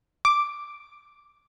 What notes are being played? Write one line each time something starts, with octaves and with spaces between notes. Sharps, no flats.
D6